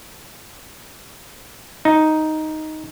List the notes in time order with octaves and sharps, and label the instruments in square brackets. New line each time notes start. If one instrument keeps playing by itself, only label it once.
[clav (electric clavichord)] D#4